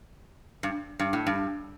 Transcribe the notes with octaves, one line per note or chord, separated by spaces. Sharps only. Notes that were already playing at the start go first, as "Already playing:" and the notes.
G2
G2
A2
G2